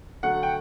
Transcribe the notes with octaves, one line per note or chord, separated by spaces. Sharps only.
D3 F#3 A3 F#5
G5